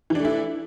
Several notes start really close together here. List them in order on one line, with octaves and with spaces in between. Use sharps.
E3 D4 A3 E4